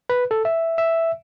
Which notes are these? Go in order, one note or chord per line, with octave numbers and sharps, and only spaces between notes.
B4
A4
E5
E5